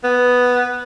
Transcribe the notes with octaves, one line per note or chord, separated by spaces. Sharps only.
B3